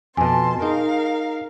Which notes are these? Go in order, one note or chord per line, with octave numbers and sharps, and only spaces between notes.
F2 B2 G#5 A5 C6
D#4 G#4 A#4 F5